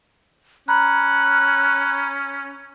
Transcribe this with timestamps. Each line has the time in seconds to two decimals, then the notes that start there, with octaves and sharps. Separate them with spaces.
0.68 C#4 A#5 B5 F#6